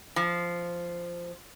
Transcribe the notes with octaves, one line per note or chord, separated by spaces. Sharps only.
F3